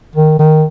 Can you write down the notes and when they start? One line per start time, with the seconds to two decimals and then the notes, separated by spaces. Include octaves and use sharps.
0.16 D#3
0.39 D#3